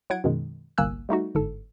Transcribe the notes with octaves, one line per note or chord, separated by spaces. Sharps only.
F#3 E4 F#5 G#6 D7
F#2 B2 D#3 G#3
G1 C2 A#3 G#5 E6 F#6
G3 A3 D#4 F#4
G1 G#2 A4